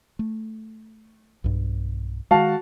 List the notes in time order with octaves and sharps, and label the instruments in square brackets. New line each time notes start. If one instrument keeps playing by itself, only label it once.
[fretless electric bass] A3
B1 G2
[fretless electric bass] D#3 G#3 [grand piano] F#4 F5 A5